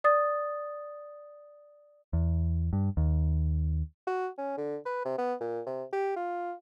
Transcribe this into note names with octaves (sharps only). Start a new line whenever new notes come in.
D5 D#6 A6
E2
G2
D#2
F#4
C#4
D3
B4
C3
B3
A#2
C3
G4
F4